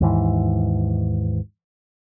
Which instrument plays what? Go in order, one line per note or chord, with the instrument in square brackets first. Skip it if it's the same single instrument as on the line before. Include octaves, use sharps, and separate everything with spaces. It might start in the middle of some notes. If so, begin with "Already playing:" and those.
[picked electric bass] D#2 G#2 E3